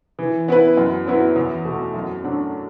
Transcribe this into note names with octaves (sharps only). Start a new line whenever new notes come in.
E3
B3 E4 B4
F#2
F#3 B3 E4
E2
B2 A3
F#2
F#3 A3 D4